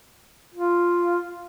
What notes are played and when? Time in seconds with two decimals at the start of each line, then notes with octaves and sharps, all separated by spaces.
0.54 F4